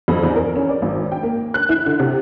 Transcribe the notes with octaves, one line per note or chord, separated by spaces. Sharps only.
F2
E2
A#4
C#4
D5
G#1
G5
A#3
F#6
E4
D3
C3